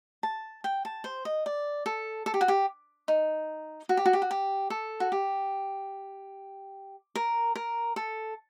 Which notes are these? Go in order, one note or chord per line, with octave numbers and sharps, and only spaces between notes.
A5
G5
A5
C5
D#5
D5
A4
A4
G4
F#4
G4
D#4
F#4
G4
F#4
G4
F#4
G4
A4
F#4
G4
A#4
A#4
A4